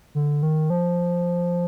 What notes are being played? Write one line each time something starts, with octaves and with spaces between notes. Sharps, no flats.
D3
D#3
F3